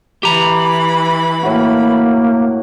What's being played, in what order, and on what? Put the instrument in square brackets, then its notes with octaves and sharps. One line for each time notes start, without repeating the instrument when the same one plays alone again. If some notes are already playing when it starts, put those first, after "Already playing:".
[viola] E3 B5 [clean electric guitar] G4 A#5
[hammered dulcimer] A2 F#4 [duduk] A#3